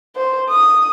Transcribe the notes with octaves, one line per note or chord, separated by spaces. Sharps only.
C5
D#6